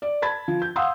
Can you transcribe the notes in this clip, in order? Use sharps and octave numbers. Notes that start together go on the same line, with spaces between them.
D5
A5 B5 G#6 A6
F3
G6
F5 F#5 C6 D#6 E6